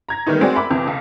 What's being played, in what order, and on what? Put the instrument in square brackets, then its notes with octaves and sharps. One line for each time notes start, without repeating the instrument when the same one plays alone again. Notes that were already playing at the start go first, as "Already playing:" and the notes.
[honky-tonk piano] A#5 G#6 A#6
D#3 G3 A3 B3 D#4
G#3 C4 F#4 G#4 D5
A#4 E5 B5 D6
F2 C3 E3
F1 C#2